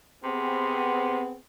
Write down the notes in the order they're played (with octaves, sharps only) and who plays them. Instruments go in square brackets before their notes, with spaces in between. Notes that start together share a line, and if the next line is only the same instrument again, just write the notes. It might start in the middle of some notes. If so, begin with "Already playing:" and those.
[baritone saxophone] C3 [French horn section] B3 C4 G#4